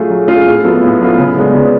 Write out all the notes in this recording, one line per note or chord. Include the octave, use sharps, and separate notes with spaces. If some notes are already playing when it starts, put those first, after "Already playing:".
Already playing: F#3 A3 F4 G#4
F#3
A3 F4 G#4
A2
F#3 B3 F4 A4
A2
F#3 B3 F4 A4
C#3
G#3 B3 D4
C#3